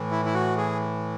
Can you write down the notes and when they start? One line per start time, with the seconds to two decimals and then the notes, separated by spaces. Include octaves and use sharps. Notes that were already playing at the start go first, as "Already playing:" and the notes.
Already playing: A2 E3
0.11 E4
0.25 E4
0.34 F#4
0.57 G#4